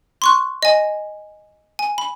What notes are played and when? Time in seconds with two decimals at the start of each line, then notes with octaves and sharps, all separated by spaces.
0.22 C6 C#6 F#6
0.63 D#5 G#5
1.79 G#5
1.98 B5